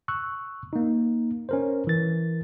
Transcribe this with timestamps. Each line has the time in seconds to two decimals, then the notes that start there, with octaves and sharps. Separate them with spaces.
0.08 C#6 E6 F#6
0.73 A#3 D#4
1.49 C#4 A#4 C5
1.87 E3 A#4 A6